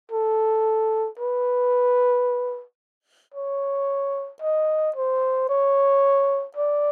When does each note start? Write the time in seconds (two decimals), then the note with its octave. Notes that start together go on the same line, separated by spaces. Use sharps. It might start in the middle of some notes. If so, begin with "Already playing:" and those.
0.12 A4
1.19 B4
3.34 C#5
4.42 D#5
4.96 C5
5.49 C#5
6.56 D5